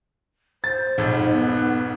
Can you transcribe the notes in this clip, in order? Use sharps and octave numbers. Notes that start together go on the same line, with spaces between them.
C5 A6
B1 F2 G#2
B3